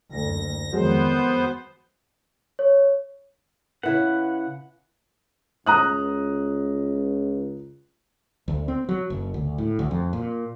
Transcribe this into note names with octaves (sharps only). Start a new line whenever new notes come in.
F#1 D2 A#6
F2 D#3 F#3 G#3 B3 C5
C#5
C#3 E4 B4 F#5
C#2 A#5 D#6 F#6
D2
C4
F#3
F#1
D2
A2
D2
F2
A#2